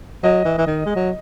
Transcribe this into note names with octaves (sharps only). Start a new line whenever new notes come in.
F#3 D#5
E3
E3
D#3
G#3
F#3